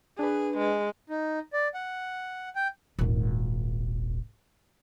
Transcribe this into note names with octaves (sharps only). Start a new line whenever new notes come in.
D4 G#4 B4
G#3
D#4
D5
F#5
G5
D#1 G#1